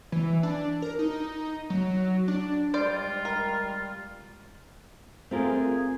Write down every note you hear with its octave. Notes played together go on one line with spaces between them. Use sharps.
E3
D4
A#4
D#4
F#3
D4
G3 G#3 F4 C5 D5
A#4
A3 C4 F4 G#4 A#4